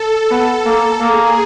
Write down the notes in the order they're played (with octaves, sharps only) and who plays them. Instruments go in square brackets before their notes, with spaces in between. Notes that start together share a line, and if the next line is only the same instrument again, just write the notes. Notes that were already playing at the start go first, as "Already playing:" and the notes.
Already playing: [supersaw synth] A4
[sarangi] B3
A#3
[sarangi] A#3 [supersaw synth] G#4